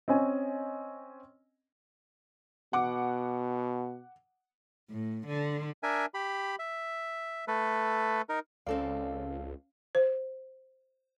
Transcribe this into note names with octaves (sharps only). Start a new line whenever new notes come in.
C4 C#4 D#5 G#5
B2 F#5 D6
A2
D3
D4 A#4 E5 G#5
G4 B5
E5
A3 A4 B4
D#4 A#4
C#2 C4 C#4 A4 D5 F5
C5